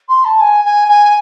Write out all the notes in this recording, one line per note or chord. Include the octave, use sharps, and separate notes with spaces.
C6
A5
G#5
G#5
G#5